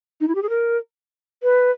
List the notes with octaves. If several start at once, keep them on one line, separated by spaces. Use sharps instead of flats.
D#4
E4
G4
G#4
A#4
B4